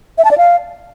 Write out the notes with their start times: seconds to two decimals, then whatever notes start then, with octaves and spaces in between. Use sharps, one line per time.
0.18 E5
0.24 A5
0.31 D5
0.38 F5